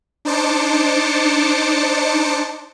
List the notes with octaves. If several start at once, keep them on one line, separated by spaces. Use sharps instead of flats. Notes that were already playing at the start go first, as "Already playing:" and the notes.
D4 D#4 C5 A5 D6 C#7